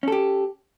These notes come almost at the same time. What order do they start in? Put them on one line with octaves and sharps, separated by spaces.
C#4 A4 G4